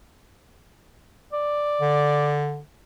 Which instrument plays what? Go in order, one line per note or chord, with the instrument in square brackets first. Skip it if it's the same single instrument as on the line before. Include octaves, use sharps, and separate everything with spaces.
[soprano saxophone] D5
[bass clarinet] D3